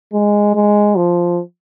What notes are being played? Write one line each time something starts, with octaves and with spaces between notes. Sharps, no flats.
G#3
G#3
F3